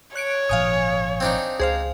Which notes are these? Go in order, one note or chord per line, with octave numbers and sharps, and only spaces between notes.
C#5 F#6 C#7 D7
G#1 A#2 F3 F5 G#5 D#6
C4 D4 D#4
C#2 G#4 C5 F5